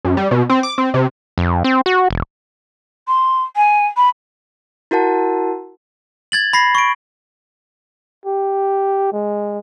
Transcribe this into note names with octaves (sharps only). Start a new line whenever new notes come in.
F#2
G3
B2
C4
D6
C4
C3
F2
C4
F#4
E1
C6
G#5
B5
E4 F#4 A#4 F#5 A5
G#6 A6 F#7
B5 A#6 C7
C#6 D7
G4
G#3